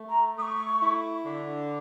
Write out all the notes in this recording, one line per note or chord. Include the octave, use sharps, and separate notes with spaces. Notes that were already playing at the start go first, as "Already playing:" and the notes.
Already playing: A3
A#5
A3 C#6 D#6
E4
D3